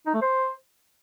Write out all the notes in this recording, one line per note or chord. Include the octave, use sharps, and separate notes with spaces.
D#4
A3
C5